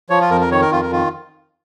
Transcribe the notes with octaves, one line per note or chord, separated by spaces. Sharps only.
F3 C#5
F4
F2 A#4
A#4
D#3 C#5
A#4
F2 F4
A#4
D#3 F4